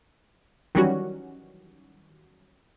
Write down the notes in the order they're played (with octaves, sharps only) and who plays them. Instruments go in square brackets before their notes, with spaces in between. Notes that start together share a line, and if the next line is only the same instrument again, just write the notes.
[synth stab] D#3 E3 F#3 G3 C#4 F#4